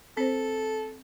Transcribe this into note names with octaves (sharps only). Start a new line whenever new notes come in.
C4 A4 C5